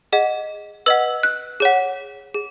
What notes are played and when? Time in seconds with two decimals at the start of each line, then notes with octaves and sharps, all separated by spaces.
0.13 G#4 D#5 F#5
0.86 B4 D#5 F#5 E6
1.23 F#6
1.60 G#4 C#5 F#5
2.34 G#4